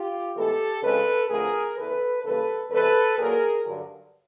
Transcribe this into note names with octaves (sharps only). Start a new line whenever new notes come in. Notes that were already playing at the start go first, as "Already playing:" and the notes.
Already playing: F4 G4
A2 E3 G#3 B3 G4 A4
C#3 F3 G#3 C4 A4 B4
F2 D3 F3 A3 G#4 A#4
E2 C#3 E3 A4 B4
C#3 E3 G3 A#3 A4 B4
E2 C3 E3 G#3 C4 A4 B4
A#2 F#3 A#3 G#4 A#4
G2 D3 F#3